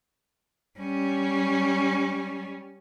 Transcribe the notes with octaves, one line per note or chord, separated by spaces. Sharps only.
G3 C#4